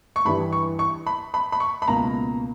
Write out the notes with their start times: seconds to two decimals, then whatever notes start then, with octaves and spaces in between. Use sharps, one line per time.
0.16 C#6
0.25 G2 E3 G3 B5
0.52 C#6
0.79 C#6
1.06 B5
1.34 B5
1.52 B5
1.60 C#6
1.82 B5
1.88 C#2 B2 A#3 A#5